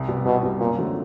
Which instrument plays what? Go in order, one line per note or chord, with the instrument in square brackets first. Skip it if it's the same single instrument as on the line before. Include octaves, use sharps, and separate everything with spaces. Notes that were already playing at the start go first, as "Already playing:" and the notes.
Already playing: [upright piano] C2
B2 G3
[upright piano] C2 [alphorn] B2
[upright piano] B2 G3
[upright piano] F#2 [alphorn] A#2
[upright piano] D3 F#3 A3 C4